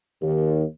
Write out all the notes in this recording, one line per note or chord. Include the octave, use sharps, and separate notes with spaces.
D#2